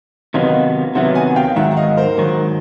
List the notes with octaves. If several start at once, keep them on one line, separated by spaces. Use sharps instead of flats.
C3 D#3 F#3 B3 D#5 F5
C3 D#3 F#3 B3 E5 F#5
F#5 G#5
F5 G5
G#2 D#3 F#3 E5 F#5
F#5
D#5 F5
A#4 C5
G#2 D#3 F#3